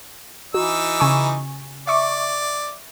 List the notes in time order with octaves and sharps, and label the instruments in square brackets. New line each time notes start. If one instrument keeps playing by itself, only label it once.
[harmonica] E3 D#4 E6 [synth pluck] F#4
[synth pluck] C#3 G#5 C#6
[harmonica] D5 [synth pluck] E5 C#6 D6